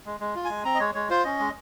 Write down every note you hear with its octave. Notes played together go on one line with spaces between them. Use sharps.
G#3
G#3
F4
G#3 G#5
C4 A#5
D#5
G#3 C#5
G#3 C#5
F4 C5
C#4 D#5
G#3